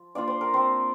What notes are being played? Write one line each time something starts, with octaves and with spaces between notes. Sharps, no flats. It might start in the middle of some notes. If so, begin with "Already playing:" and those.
Already playing: F3
A#3 D4 F4 D5
C5
A#4
C4 C5